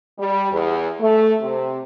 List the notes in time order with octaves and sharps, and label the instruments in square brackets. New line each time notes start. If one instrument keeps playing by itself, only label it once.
[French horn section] G3
E2
A3
C3